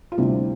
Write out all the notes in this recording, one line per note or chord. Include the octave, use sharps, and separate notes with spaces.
F4
D2 C3 G3 E4